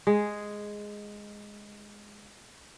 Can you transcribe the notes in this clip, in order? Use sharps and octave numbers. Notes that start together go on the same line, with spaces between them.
G#3 G#4